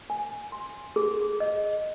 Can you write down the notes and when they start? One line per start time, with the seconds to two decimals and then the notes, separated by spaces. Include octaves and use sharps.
0.10 G#5
0.52 C6
0.96 G#4
1.40 D#5